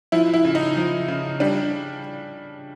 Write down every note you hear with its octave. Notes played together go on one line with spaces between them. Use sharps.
F3 E4
E4
C#3
D#4
F3
C#3
G3 D4